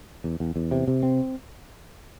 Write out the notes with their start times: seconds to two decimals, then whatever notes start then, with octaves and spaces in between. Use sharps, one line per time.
0.24 E2
0.40 E2
0.56 E2
0.71 C3
0.88 C3
1.03 C4